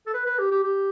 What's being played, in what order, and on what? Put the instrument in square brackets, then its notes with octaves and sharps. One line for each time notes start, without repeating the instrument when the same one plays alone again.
[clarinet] A4
B4
B4
G4
G4
G4